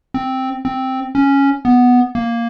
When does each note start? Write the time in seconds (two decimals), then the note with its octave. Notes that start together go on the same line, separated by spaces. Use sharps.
0.14 C4
0.65 C4
1.15 C#4
1.65 B3
2.15 A#3